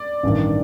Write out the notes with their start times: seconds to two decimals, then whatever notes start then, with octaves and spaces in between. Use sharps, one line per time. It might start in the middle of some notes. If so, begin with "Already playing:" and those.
Already playing: D5
0.23 A1 G2 D#3